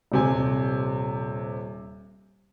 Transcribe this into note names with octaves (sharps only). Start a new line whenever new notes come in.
D#1 C3 G#5